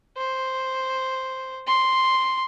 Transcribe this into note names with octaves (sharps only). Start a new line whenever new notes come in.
C5
C6